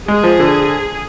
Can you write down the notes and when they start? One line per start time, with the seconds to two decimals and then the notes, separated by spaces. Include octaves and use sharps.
0.08 G#3 G#4
0.23 F3
0.40 D3